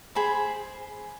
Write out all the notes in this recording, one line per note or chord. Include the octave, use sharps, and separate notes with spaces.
G#4 C5 B5